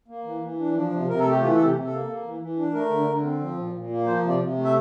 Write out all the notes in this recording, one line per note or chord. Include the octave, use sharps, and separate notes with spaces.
A#3
E3
E3
D4
F3 D4
C3
C3 A#4
A3 A4
G4
E3 F4
C3 A4
G4
C3
A4
A#3
A#3
E3
E3
D4
A3 A#4
D3
D3
C4
F3
A#2
A#2
A#3
F3 C5
C3
D5
C3
A3
E5